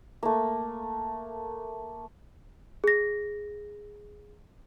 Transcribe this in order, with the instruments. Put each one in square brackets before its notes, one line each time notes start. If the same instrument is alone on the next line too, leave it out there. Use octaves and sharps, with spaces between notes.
[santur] A3 A#3
[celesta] G#4 A#6